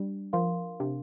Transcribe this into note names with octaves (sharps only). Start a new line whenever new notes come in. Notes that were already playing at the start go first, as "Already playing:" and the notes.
Already playing: G3 D4
F3 A#4 F5 C6
C3 D4